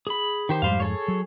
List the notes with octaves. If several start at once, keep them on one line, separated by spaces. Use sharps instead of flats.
G#4 B5
D#3 G4 C5
F2 G#2 G3 C5 F5
G#4 A4 C#5
F#3